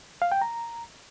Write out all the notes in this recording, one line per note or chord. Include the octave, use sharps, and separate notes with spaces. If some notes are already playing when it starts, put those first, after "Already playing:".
F5
G5
A#5